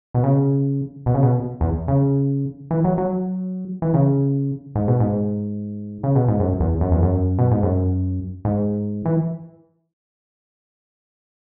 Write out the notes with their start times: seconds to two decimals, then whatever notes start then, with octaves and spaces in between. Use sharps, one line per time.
0.14 B2
0.24 C#3
1.06 B2
1.14 C#3
1.23 B2
1.61 E2
1.88 C#3
2.71 E3
2.84 F#3
2.98 F#3
3.82 E3
3.94 C#3
4.75 G#2
4.88 B2
5.00 G#2
6.03 C#3
6.16 B2
6.28 G#2
6.39 F#2
6.60 E2
6.81 F#2
6.91 E2
7.02 F#2
7.39 B2
7.51 G#2
7.63 F#2
8.45 G#2
9.06 E3